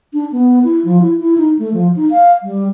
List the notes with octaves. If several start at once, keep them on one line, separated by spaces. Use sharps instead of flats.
D4
B3
E4
F3
E4
E4
D#4
A3
F3
D#4
F5
G3